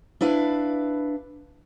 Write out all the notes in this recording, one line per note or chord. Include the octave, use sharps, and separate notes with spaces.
D4 E4 B4 F5